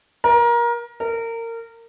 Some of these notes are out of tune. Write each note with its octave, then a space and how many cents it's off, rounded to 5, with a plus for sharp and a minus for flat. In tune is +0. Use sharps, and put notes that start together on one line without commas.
A#4 +25
A#4 -25